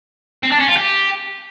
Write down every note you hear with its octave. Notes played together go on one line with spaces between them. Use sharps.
C4
D4
C#4
F4
G4